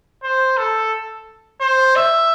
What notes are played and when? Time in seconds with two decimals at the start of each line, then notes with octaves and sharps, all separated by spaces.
0.23 C5
0.57 A4
1.61 C5
1.96 E5